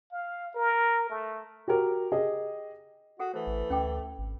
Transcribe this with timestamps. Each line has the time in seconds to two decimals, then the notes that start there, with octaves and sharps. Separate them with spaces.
0.12 F5
0.54 A#4
1.10 A3
1.68 F#4 G4 A#4
2.12 G4 G#4 D#5
3.19 F#4 G#4 A4 F#5
3.34 E3 A3 C5
3.46 A1
3.70 D2 C#4 G5 D6
4.18 G#1